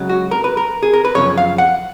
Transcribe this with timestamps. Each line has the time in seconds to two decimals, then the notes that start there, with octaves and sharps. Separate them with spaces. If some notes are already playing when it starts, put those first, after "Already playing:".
Already playing: C#2 C#3 F#3
0.09 F#4
0.31 A#4
0.44 B4
0.57 A#4
0.83 G#4
0.93 A#4
1.05 B4
1.15 F#2 C#3 F3 C#5
1.38 F5
1.58 F#5